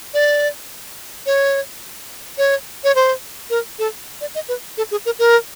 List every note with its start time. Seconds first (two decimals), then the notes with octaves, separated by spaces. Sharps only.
0.14 D5
1.26 C#5
2.38 C#5
2.84 C#5
2.95 C5
3.50 A#4
3.79 A4
4.21 D5
4.35 D#5
4.49 B4
4.77 A4
4.91 G#4
5.05 A#4
5.19 A#4